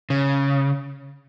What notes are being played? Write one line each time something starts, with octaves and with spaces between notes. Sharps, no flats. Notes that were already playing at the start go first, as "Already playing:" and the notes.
C#3